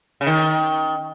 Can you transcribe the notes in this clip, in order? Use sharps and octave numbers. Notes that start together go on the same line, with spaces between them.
C#3
D#3